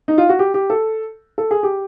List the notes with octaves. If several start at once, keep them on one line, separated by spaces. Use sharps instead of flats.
D#4
F4
F#4
G4
G4
A4
A4
G#4
G4